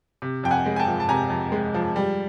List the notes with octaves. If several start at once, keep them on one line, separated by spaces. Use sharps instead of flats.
C3
F2 G5
F#5 G#5
G#3
G#5
G5 A5
F3
A5
C3 G#5 A#5
F2
G#3
F3
G3